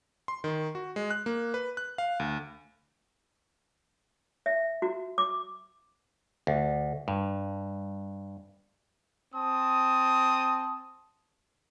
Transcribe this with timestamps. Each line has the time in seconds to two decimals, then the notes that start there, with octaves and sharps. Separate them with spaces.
0.28 C6
0.44 D#3
0.75 F#4
0.96 G#3
1.10 F#6
1.26 A#3
1.54 B4
1.77 F#6
1.98 F5
2.20 D2
4.46 E5
4.82 F#4
5.18 D6
6.47 D2
7.08 G2
9.35 C4 A5 D#6